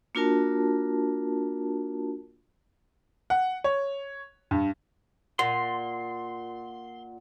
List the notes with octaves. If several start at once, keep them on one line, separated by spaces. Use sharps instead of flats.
A#3 D4 F4 F#4 A#4 A5
F#5
C#5
G2
A#2 F#5 C6